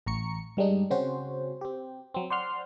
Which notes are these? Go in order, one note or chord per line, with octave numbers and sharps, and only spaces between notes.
A1 A#5 C#6 C#7
G2 G3 G#3 D4 D#4
C#3 C4 C#4 F#4 C5
C4 G4
F#3 C4
C5 D5 F#5 C6 F6